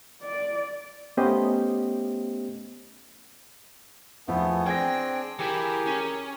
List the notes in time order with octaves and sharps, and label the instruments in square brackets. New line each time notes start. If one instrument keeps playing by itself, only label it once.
[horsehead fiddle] D5
[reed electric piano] A3 B3 C#4 G4 C5 D#5
[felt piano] E2 F3 [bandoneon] A3 B3 [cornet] G#5
[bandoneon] C4 D4 G#4 [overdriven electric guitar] G5 [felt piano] G#6 A#6
[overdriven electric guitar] E3 E4 [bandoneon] G4 G#4 [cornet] A#4
[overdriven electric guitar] C#4